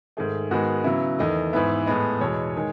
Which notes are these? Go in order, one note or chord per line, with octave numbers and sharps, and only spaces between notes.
G#2 D#3 A3 G#4
G#2 D#3 G#3 B3 F#4
C#3 F#3 B3 E4
E2 D#3 A3 D#5
G#2 E3 B3 E5
A2 G#3 B3 D#5
E2 B2 G#3 C#5
D#3 G#3